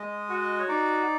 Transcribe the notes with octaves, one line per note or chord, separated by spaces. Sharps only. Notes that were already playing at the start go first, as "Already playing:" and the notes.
Already playing: G#3 D#5
F#4
C#5
D#4 D5